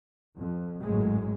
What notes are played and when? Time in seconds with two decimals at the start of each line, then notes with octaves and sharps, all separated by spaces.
0.37 F2
0.81 G#1 F#2 A2 G#3